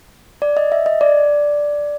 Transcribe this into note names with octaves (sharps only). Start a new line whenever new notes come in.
D5
D#5
E5
D#5
D5